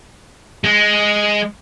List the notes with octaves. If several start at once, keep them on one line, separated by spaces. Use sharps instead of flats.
G#3